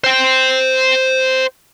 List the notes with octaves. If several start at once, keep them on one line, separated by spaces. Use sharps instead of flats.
C5 G5